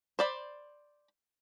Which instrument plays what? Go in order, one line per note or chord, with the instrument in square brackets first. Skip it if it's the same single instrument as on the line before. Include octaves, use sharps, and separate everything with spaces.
[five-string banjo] C5 D5 B5